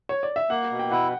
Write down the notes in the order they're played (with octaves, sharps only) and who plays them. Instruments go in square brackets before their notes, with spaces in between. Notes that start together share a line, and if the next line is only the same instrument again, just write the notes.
[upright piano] C#5
D5
E5
[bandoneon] A#3 [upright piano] F#5
[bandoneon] B2
[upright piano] G5
[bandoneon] E4 [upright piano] F#5